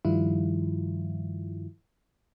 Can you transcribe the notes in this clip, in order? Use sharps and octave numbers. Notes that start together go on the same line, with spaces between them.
G2 D#3 F3 G3 E4 F4